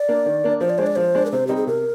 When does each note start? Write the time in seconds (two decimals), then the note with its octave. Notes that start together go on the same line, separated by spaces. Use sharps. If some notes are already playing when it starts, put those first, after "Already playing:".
Already playing: D5
0.08 A#3 D4
0.26 D#3
0.44 A#3 D4
0.61 F3 C5
0.70 D5
0.78 G#3 D4 C5
0.87 D5
0.96 F3 C5
1.15 G#3 D4
1.26 A#4
1.31 C3 C5
1.47 G3 C4 D#4 G4
1.56 G#4
1.67 C3 A#4